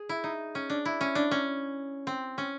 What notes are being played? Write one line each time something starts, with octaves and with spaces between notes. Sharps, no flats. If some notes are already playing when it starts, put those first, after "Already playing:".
Already playing: G#4
E4
D#4
C#4
D4
E4
C#4
D4
C#4
C4
C#4